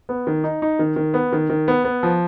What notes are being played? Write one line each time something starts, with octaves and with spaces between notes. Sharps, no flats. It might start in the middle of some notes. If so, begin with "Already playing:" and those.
B3
D#3
D#4
D#4
D#3
D#3
B3
D#3
D#3
B3
B3
F3